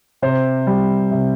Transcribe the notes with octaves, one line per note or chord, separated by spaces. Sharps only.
C3 C5
G3
C3